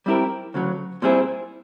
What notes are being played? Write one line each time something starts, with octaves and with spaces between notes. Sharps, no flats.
G3 C4 E4 G4 A#4
D2 C#3 F#3
A#2 G3 C4 E4 G#4